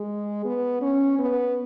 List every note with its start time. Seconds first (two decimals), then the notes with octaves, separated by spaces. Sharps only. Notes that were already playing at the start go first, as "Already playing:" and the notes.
Already playing: G#3
0.45 B3
0.82 C#4
1.19 B3